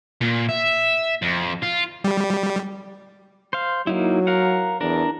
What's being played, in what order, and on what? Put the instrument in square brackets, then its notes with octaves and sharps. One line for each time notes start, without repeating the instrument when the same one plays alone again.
[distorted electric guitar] A#2
E5
F2
F4
[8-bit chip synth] G3
[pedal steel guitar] C5 F5
[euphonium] F#3 [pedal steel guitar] A#3 D#4 E4
[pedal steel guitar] A#4 F5 F#5
[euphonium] E2 [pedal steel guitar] D4 A#4